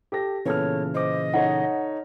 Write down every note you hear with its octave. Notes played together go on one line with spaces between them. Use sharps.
G4 A4 A#6
A#2 C#3 E3 B3 A4 C#5 F6
C5 D#5 D6
D#4 A4 C#5 F#5